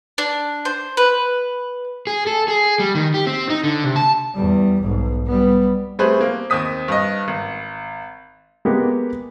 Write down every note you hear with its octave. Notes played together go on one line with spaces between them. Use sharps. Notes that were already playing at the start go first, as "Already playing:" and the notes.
D4
C5
B4
G#4
A4
G#4
G3
D#3
G4
C4
D#4
D3
C3
A5
E2 G3
B1 G#2
G3 B3
G3 A3 C4 G#4 B4 C5
A#3
D#2 C4 D#6 B6
G2 D#5
G#1
G#3 A#3 B3 G4